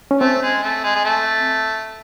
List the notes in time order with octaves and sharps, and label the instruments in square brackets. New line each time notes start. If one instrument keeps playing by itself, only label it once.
[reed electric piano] C#4
[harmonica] A3 [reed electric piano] C4
[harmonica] G#3
A3
G#3
G#3
A3